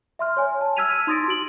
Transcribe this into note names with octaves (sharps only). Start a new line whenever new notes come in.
E5 C6 F6
C#5 G#5
A5
E6 F6 G#6 B6 D#7 F7
D#4 C6 D#6 A6 A#6 D7
F#4 D7 F#7